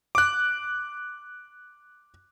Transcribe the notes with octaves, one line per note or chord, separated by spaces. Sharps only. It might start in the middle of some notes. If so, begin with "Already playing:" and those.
D6 F#6